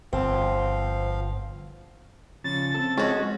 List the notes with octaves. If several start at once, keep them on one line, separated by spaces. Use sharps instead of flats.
G1 F3 C4 F5
C#3 F3 C#4 A6
C4 A4
G#3 C#4 F#4